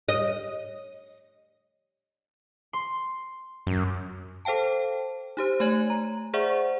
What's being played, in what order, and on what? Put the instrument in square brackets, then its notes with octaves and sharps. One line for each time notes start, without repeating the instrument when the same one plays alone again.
[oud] D#5
[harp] C6
[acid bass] F#2
[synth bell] A4 C5 F5 G5 A5
D#4 G4 C5
A3 C#5 G#5 G#6 F#7
A#5
G#4 C5 D5 E5 F#5 C#6